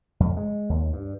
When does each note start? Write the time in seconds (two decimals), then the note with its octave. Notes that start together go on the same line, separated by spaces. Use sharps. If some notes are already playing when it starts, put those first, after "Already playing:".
0.20 F2
0.37 G#3
0.69 D#2
0.93 G2